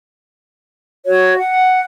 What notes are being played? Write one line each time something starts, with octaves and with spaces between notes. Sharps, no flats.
F#4 C#5
F#5